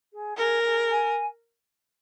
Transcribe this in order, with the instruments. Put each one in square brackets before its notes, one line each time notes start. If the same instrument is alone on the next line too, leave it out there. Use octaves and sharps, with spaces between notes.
[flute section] G#4
[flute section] G#4 [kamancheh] A#4
[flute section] G#4
G#5